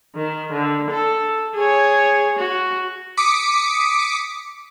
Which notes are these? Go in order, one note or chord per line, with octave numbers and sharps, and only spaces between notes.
D#3
D3
A4
G#4 C#5
F#4
D6 D#6 B6 C#7